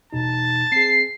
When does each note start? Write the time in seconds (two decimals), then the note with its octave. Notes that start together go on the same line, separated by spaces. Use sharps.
0.13 E2 B2 D#4 A5
0.72 C4 G#4 C7